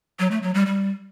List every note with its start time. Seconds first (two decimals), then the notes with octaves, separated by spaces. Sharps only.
0.19 F#3
0.31 A3
0.43 F#3
0.54 G3
0.66 G3